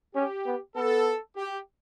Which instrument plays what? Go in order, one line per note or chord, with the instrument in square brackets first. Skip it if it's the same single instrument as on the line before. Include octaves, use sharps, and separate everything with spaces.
[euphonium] C#4 [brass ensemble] G4
[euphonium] B3
[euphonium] B3 [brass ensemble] A4
[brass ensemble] G4